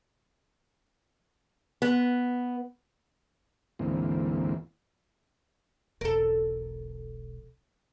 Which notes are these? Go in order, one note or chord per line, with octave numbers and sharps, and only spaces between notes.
B3
D2 G#2 E3 A#3 C4
E1 B1 A4 A#4